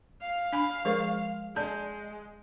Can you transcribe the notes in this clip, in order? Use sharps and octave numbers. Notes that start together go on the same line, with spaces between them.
F5
D4 G#5 B5
F3 G#3 A#4 C5
G#3 D5 A5 G6